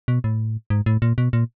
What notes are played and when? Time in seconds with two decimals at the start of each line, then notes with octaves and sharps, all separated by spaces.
0.08 B2
0.24 A2
0.70 G#2
0.86 A2
1.02 A#2
1.18 B2
1.33 A#2